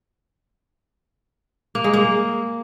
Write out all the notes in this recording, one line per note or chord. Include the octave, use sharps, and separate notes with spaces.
A#3
G#3
A#3